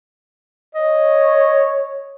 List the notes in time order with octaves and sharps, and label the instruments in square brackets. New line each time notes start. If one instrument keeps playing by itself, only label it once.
[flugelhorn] C#5 [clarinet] D#5